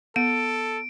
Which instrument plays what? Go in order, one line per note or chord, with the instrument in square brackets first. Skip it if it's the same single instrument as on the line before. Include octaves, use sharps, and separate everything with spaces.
[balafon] B3 [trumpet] A4 [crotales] D7